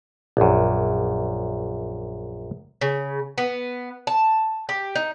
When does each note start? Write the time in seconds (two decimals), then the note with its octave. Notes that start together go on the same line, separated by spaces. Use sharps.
0.37 A#1 F#2
2.81 C#3
3.38 B3
4.07 A5
4.69 G4
4.95 D#4